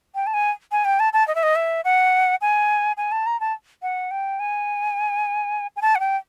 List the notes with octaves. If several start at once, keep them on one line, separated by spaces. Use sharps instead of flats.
G5
A5
G#5
G#5
G5
A5
A5
D#5
E5
D#5
E5
F#5
G#5
G#5
A5
A#5
A5
F#5
G5
G#5
G#5
A5
F#5
G5